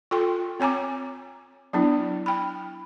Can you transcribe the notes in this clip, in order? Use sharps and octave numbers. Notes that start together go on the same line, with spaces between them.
F4 A4 G5 C6
C4 C#5 G#5 A#5 D6
F#3 B3 D4 E4
G5 B5